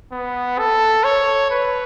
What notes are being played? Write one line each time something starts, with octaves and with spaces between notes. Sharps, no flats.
B3
A4
C#5
B4